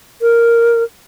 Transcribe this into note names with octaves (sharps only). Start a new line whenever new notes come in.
A#4